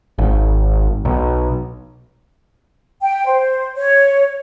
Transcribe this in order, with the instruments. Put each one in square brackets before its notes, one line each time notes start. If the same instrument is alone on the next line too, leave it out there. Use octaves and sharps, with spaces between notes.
[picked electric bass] G#1
B1
[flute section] G5
C5
C#5